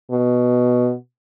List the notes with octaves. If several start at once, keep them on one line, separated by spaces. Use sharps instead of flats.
B2